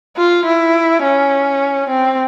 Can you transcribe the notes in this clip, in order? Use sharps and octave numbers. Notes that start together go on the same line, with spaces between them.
F4
E4
C#4
C4